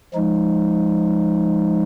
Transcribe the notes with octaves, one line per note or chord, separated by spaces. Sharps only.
F3 G#3 D#4